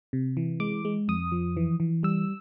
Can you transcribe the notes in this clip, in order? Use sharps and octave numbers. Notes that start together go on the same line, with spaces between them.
C3
E3
G#3 D6
G#3
F2 D#6
F3
E3
E3
G3 E6